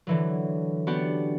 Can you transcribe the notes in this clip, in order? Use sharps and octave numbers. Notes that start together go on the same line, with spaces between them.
D3 E3 F#3
B3 D4 F#4 G4